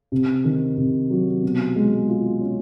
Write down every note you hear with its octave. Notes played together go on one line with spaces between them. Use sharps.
C3
D#3
C3
F#3
B2
G#3
F4
C#4